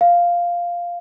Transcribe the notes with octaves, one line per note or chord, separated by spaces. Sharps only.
F5